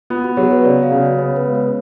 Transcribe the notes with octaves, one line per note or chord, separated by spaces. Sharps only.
B3 F4
F#4
F#3 G#4
B4
C#3 D5
F5
C#3
D5
B3 C#5
B4
G#3
B4